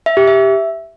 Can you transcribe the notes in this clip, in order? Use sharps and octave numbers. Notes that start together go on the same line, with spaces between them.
E5
G4
E5